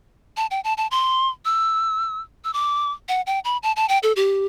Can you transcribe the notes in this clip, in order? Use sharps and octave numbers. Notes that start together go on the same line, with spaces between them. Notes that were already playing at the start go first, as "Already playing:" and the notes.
A5
G5
A5
A5
C6
E6
E6
D6
F#5
G5
B5
A5
A5
G5
A4
G4